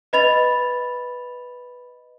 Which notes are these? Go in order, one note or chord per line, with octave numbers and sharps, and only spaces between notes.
B4 D#5 B5 A6 F7